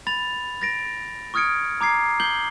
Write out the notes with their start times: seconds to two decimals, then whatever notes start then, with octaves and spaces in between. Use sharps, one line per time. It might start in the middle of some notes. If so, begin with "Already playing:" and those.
0.07 B5 A6 F7
0.62 A6 A#6 D7
1.34 C#6 D#6 F6 G#6 C#7 D7
1.81 A#5 D6 G#6 C7
2.20 G6 C7 F#7 G7